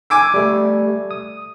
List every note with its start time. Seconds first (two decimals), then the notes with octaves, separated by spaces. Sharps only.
0.10 G#5 D6 E6
0.34 G3 A3
1.11 D#6